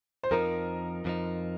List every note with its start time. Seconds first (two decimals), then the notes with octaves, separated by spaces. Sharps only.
0.23 C5
0.31 F2 F3 D#4 A#4
1.05 F2 F3 D#4